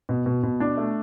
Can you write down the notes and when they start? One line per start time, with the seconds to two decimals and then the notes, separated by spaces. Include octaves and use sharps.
0.09 B2
0.26 B2
0.43 B2
0.60 D4
0.77 A3